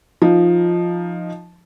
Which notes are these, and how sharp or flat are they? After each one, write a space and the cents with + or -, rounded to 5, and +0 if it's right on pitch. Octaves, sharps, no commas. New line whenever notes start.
F3 +0 D#4 +0